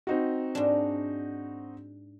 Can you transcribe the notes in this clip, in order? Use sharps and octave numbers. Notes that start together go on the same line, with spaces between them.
C4 D#4 F#4
G#2 D4